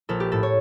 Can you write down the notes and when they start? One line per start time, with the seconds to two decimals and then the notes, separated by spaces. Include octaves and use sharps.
0.09 A#1 A4
0.20 G4
0.32 A2 A4
0.43 C#5